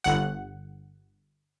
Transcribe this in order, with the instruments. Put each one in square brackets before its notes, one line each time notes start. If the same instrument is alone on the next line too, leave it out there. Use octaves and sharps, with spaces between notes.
[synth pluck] G1 F#5